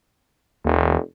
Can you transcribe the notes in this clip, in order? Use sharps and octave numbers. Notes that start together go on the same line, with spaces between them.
F1 D#2